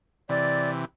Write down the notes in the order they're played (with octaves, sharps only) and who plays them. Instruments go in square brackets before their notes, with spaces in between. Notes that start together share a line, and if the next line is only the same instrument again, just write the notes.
[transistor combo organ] C3 E3 [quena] D5